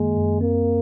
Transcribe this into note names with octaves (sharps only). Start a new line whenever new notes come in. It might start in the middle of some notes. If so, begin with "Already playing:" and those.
Already playing: F#2 D#3 G#3 A#3
F#2
A#3 C4